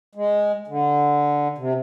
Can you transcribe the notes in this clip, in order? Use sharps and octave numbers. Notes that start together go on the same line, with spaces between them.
G#3
D3
C3